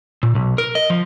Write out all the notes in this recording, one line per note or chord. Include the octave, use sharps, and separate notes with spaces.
A#2
B1
A#4
D#5
F3